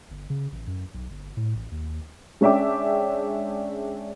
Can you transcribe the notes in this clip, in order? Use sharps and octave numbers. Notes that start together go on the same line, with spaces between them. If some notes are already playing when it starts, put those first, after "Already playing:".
G1
C#3
A1
F#2
B1
G1
A2
A1
D#2
G#3 C#4 D4 E5 G5 D6